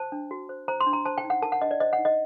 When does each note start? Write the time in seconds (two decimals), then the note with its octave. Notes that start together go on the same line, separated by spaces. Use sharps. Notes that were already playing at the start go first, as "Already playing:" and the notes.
Already playing: C5 A5
0.12 D4
0.31 F#4
0.49 C5
0.68 C5 A#5
0.80 C6
0.87 D4
0.93 A#5
1.06 C5 A5
1.18 G5
1.25 D#4
1.30 F#5
1.42 A#4 A5
1.52 F#5
1.61 D4 D#5
1.71 D5
1.80 C5 D#5
1.93 F#5
1.98 D#4
2.05 D#5